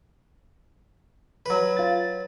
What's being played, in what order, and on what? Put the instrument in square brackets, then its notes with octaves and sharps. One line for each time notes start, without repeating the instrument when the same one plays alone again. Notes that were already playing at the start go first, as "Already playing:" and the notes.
[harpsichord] F#3 B4
[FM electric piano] F4 A6